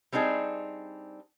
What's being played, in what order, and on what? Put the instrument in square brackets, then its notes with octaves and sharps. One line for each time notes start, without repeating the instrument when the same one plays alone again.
[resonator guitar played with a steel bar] G3 C4 D4 D#4 G#4